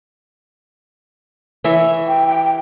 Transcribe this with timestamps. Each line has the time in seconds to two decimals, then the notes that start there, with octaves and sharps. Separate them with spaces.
1.64 E3 C#5 E5
2.07 G5
2.27 G5